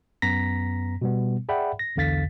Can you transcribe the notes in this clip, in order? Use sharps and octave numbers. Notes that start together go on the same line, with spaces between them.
F#2 B3 A#5 A#6 B6
B2 G3 B3
G#4 D5 E5 F#5 G5 B5
A#6
B1 E2 D3 F5 A6 B6